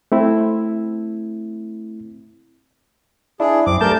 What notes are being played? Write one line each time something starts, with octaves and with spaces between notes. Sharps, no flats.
A3 C4 E4
D4 E4 G#4
F#2 C4 D6
G2 A3 A#4 A5 G6